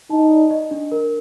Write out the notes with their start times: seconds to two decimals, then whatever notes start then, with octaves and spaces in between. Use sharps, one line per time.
0.10 D#4 A5
0.31 D5
0.50 D#5
0.71 D4
0.92 A#4